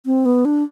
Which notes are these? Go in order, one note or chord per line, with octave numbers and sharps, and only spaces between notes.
C4
B3
D4